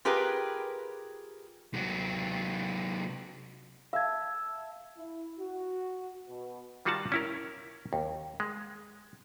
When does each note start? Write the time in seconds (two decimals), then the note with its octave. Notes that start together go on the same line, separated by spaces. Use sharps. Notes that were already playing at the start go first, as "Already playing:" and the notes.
0.05 F4 G4 G#4 A#4 B4 G5
1.74 C3 F#3
3.93 E5 F5 A5 G#6
4.98 E4
5.39 F#4
6.28 B2
6.85 D#3 G3 F4 F#4 F#5 A5
7.12 C#4 E4 A#4
7.93 D#2
8.40 G#3